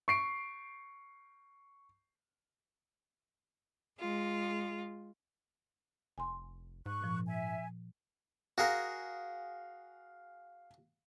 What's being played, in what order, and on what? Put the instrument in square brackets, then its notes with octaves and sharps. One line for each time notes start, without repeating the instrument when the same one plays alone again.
[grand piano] C#6 C7 D7
[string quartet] G#3 F4
[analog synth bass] F1 [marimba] G#5 C6
[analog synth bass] G#2 [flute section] C#6 F#6
[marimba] A#2 F3
[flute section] E5 G#5
[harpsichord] F#4 G#4 A#4 [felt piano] F5